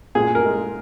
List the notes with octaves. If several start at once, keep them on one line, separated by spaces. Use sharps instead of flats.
A#2 G#4
A#4
G#3